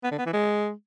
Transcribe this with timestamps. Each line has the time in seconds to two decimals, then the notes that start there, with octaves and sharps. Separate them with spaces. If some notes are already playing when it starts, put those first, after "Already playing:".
0.04 B3
0.11 D3
0.19 B3
0.26 E3
0.33 G#3